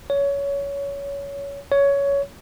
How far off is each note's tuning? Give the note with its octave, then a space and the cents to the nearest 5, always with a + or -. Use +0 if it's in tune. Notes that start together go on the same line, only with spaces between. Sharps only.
C#5 +20
C#5 +15